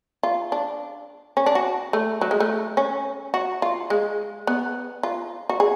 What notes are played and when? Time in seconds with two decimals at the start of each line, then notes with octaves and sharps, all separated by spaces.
0.23 F4
0.52 D4
1.37 C#4
1.46 D4
1.55 F#4
1.93 A3
2.21 F#3
2.31 G#3
2.40 A3
2.77 C#4
3.34 F#4
3.62 F4
3.90 G#3
4.47 B3
5.03 F4
5.49 F#4
5.60 G#4